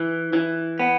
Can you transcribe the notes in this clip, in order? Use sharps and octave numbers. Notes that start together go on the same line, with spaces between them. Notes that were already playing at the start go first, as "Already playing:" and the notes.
Already playing: E3
E3
B3